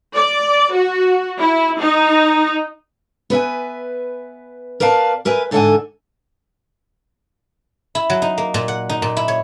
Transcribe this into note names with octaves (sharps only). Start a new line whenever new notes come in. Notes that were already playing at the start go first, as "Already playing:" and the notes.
D5
F#4
E4
D#4
B3 B4 E5 G#5
A#4 B4 D5 F5 A5
A#4 B4 E5 G#5
G#2 D3 A4 E5 F#5 G#5
E4
F#3
D#4
A#3
A#2
F#5
D#4
A#2
E4
C#5